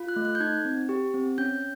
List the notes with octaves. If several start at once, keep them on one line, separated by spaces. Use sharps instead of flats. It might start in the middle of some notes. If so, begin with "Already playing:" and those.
Already playing: F4
F#6
A3
F#6
G6
D#4 G#6
C4
G4
C4
C#4 G6